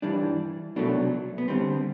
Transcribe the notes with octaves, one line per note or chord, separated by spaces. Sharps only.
G2 E3 G3 D4
C2 B2 F#3 A3 D4
B3
D2 D3 G3 C4